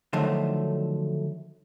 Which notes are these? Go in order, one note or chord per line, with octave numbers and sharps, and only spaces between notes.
D3 D#3 F3 F#3 A3